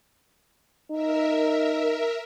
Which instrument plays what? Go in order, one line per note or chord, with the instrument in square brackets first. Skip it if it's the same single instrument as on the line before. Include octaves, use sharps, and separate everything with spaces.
[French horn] D#4 [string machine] A#4 E5